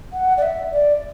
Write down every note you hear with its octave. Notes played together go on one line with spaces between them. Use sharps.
F#5
D5
E5
D5